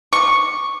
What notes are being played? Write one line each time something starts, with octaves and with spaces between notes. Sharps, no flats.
C#6